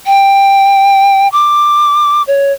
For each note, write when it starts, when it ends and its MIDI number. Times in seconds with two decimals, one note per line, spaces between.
0.07 1.28 79
1.33 2.22 86
2.28 2.53 73